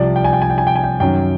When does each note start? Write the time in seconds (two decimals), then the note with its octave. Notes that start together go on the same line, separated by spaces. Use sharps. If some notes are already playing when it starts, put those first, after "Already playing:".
Already playing: C2 C3 F3 D5
0.16 G5
0.24 G#5
0.33 G5
0.42 G#5
0.50 G5
0.58 G#5
0.67 G5
0.76 G#5
0.84 G5
1.00 F#2 D#3 F#3 G5